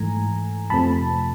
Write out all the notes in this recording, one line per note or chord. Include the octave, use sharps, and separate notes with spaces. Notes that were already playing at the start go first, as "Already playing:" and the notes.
Already playing: G#2 E3 A3 G#5 A#5
F2 C3 F3 A3 C4 A5 B5